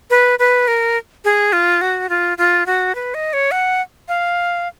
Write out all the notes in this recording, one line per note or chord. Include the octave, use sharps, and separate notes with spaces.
B4
B4
A#4
G#4
F4
F#4
F4
F4
F#4
B4
D#5
C#5
F#5
F5